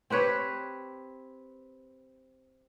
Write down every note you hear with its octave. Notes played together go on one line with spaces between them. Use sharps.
C4 G4 B4 C#5